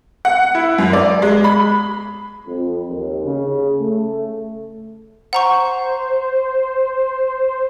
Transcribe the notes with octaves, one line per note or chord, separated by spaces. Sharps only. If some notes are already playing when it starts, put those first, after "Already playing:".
F#5
E4
F#2
D5
G#3
B5
F2
D#2
C#3
A3
C5 F#5 A#5 C#6